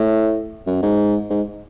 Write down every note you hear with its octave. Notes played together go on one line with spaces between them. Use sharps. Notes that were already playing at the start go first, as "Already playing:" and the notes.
Already playing: A2
F#2
G#2
G#2